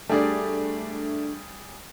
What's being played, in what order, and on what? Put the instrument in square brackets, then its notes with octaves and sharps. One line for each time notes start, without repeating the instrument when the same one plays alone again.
[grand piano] G3 G#4 D5 [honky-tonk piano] A3 D4